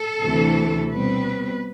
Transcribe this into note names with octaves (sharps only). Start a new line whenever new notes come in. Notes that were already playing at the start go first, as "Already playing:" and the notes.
Already playing: A4
D2 C3 E3 A3 C4
B2 G3 C4 B4